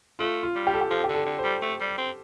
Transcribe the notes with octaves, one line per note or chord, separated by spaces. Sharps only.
A3 F4
F4
G3
G4
A4
G4
F3 A4
G4
D3
A4
D3
C5
G3
A3
G3
C4